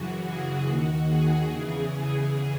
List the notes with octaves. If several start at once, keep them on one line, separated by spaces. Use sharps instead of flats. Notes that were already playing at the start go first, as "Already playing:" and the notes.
Already playing: F#2 C#3 E3 F#4
G#4
D#2 D#3 F#4
G#4
E2 C#3 E3 G#4
G#4